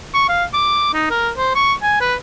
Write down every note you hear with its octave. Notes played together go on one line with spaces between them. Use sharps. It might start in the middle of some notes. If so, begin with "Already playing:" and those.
C#6
F5
D6
D#4
A#4
C5
C#6
G#5
B4